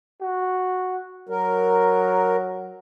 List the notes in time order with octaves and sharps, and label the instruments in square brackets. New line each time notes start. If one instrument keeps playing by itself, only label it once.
[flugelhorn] F#4
[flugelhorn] F#3 [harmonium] A#4